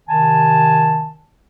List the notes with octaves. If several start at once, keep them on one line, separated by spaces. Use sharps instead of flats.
C3 D#3 G#5 A5